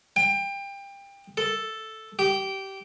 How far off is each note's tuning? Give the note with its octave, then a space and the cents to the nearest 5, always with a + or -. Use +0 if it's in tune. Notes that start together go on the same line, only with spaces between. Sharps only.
G5 +25
A4 +0
G4 -15